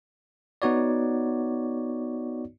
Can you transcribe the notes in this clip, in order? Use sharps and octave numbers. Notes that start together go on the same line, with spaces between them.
B3 D#4 F#4 C#5 D5